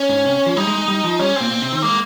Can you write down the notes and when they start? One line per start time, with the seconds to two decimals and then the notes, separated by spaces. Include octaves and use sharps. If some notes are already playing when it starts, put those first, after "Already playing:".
Already playing: C#4
0.09 G#2
0.25 C3
0.46 F3
0.57 G3 D#4
0.67 G#3
0.78 G#3
0.88 G3
1.04 F3
1.19 G3 C#4
1.36 A#2 C4
1.51 A#2
1.62 C3
1.72 D#3
1.82 G#3 A#3